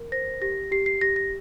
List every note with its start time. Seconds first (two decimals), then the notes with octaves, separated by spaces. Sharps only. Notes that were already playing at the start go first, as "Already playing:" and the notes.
Already playing: A#4
0.12 C5 A#6
0.42 G4 A#6
0.72 G4 C7
0.86 C7
1.01 G4 A#6
1.16 A#6